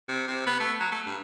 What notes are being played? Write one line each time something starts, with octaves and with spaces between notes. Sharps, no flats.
C3
C3
B3
A3
F#3
A3
G2